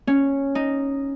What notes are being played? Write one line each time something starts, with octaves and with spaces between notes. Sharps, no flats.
C#4
D#4